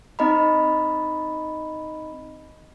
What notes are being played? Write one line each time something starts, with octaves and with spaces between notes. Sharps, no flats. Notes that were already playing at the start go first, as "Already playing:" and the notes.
C4 D#4 D#5 A#5 B5